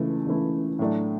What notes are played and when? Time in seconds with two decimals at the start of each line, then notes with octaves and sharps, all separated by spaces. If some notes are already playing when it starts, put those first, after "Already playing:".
Already playing: C#2 C#3 E3 A3 E4
0.26 C#2 C#3 E3 A3 E4
0.79 A2 F#3 A3 D4